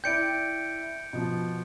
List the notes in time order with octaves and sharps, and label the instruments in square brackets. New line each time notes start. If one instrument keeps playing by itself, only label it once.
[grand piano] E4 D5 G5 [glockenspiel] G6 C#7 D7
[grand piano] B2 F3